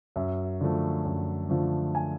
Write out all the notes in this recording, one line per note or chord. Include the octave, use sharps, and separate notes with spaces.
F#2 E5
D3 F3 A3
F#2
D3 F3 A3
G#5